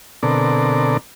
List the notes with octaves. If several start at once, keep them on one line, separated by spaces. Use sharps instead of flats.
B2 D3 C4 A4 A#4 D5